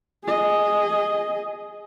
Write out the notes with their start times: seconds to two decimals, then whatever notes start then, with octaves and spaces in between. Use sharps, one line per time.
0.24 G#4 D#5